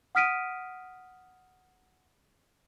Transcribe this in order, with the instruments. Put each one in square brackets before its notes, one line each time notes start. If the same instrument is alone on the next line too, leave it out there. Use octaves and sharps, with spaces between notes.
[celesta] F#5 D#6 F6 B6 D7 D#7